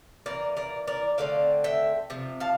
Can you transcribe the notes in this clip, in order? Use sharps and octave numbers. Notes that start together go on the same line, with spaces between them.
E3 A#3 A#4 D5
A#4 D5
A#4 D5
D3 A3 C4 D5 F5
E5 G5
C3 F3
F5 A5